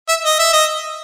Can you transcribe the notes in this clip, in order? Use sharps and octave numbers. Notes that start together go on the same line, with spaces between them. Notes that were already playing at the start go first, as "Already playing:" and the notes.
E5
D#5
E5
D#5